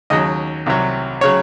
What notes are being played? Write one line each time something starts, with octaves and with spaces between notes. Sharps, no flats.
D#2 C#3 F#3 D#5
C2 C3 F#3
C#3 F#3 C#5